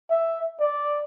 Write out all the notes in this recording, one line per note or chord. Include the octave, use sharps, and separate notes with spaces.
E5
D5